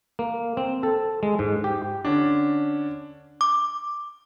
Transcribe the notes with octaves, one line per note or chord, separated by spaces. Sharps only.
A#3
C4
A4
G#3
G#2
G4
D3 C#4 D4
D6